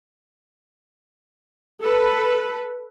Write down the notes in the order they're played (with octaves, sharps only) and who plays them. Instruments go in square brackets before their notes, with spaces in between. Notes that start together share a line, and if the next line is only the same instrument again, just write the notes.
[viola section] A4 B4